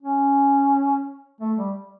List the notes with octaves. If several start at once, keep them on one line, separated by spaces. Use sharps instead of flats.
C#4
A3
G3